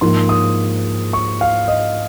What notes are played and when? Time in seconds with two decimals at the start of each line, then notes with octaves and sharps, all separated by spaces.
0.01 G#2 F3 A#3 C6
0.29 D#6
1.13 C#6
1.41 F5
1.68 D#5